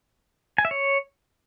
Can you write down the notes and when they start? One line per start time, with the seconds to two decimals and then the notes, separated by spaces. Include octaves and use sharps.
0.58 G#5
0.65 E5
0.71 C#5